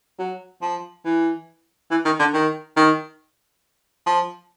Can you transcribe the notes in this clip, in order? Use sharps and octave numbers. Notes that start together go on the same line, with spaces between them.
F#3
F3
E3
E3
D#3
D3
D#3
D#3
F3